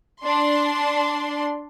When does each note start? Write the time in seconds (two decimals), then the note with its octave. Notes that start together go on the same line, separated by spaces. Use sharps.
0.23 D4 C6